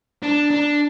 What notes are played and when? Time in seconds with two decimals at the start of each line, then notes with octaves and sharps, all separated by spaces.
0.23 D4
0.50 D4